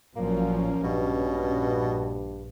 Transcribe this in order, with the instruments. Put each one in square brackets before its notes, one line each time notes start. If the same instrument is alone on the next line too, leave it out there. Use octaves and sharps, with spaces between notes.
[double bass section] A1 F3 F#3 [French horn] A#2 [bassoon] A#3 [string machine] C#4
[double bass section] A#1 [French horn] G2 [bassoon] B2